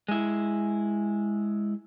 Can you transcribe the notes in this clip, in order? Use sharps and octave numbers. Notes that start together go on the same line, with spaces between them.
G#3 E4